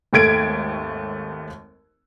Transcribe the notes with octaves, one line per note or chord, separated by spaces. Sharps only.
G#1 D#2 A3 G#6 D7